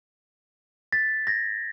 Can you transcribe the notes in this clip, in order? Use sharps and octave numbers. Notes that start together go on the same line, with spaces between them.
A6 B6
G#6 A#6